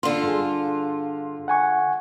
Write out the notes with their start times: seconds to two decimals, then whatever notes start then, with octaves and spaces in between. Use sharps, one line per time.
0.03 D3 F4 C6
0.23 G2 G#4
1.48 F#5 G#5 C#6